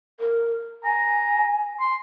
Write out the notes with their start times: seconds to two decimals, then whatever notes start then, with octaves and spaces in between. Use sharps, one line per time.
0.20 A#4
0.85 G#5 A#5
1.80 C6